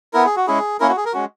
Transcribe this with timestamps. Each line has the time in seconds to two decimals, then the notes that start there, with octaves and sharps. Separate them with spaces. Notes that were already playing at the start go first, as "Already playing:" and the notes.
0.13 B3 E4 A#4
0.26 G#4
0.36 F#4
0.47 G#3 C#4 E4 G#4
0.80 A#3 C#4 E4 A#4
0.89 F#4
0.97 G#4
1.05 A#4
1.13 G#3 C#4 F#4